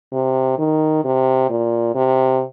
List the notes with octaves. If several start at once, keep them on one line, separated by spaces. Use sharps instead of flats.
C3
D#3
C3
A#2
C3